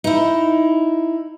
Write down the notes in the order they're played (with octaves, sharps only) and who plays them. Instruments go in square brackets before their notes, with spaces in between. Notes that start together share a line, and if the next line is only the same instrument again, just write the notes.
[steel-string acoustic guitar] D#4 E4